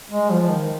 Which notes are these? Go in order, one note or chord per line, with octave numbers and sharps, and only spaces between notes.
G#3
F3
D#3